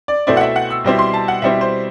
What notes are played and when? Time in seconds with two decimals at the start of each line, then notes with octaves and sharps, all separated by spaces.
0.08 D5
0.27 B2 A3 C4 E4 D5
0.37 F#5
0.41 E5
0.56 F#5
0.70 E6
0.84 B2 G3 C4 E4
0.99 C6
1.13 A5
1.28 F#5
1.42 B2 G3 C4 E4 E5
1.61 C5